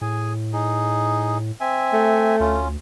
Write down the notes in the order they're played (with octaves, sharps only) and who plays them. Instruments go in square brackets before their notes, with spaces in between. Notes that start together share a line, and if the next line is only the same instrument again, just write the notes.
[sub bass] A2 [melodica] G#4 G#5
[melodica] D#4 G#4
C4 E5 G#5
[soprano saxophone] A3
[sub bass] D2 [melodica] C#4 F4